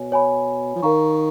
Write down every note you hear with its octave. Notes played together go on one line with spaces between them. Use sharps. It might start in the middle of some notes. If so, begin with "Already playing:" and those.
Already playing: B2 C#5 G#5
C#5 G#5 B5
F3
D#3 A#4 F5 A#5 C#6